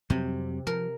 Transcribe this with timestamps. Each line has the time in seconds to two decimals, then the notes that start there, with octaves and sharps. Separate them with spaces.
0.10 F2 C3 F#3 G3
0.67 F3 A#4